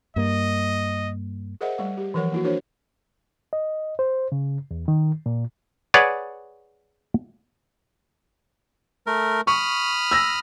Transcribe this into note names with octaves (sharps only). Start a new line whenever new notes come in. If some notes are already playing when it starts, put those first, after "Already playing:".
G2 A#3 D#5
G#4 A#4 C5 D#5 E5 F#5
G3 A3 F#5
G4
E3 F3 A#4 C#5 F#5
A#3 E4 F#4
D4 E4 F#4 A#4 C5 C#5
D#5
C5
C#3
E2
D#3
A#2
G#4 B4 C#5 D5 F#5
A3 A#4
B5 C#6 D#6 F6
E6 A#6